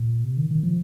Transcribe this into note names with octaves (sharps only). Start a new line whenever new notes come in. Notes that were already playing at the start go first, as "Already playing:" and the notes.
Already playing: A#2
C3
D#3
D#3
F3